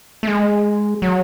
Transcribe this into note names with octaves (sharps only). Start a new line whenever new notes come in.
A3
G#3
F#3